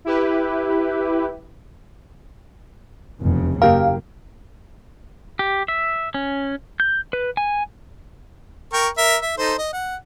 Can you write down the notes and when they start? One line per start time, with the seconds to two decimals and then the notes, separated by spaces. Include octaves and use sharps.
0.05 E4 G4 B4
3.19 F1 E2 C#3
3.62 F#1 A#3 G4 A#4 F5
5.39 G4
5.68 E5
6.14 C#4
6.80 G6
7.13 B4
7.37 G#5
8.73 A#4 G5 C#6
8.97 A#4 E5
9.22 E5
9.38 D#4 A4 C5
9.58 D#5
9.73 F#5